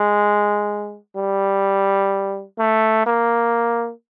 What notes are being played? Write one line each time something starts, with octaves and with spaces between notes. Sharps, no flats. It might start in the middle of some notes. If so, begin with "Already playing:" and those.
Already playing: G#3
G3
A3
A#3